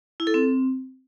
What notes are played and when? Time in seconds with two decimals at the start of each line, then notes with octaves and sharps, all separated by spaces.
0.20 E4
0.27 A4
0.34 C4